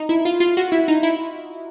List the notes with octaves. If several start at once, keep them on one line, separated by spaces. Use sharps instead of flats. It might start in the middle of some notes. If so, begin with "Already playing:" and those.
Already playing: D#4
E4
F4
F4
F#4
E4
D#4
E4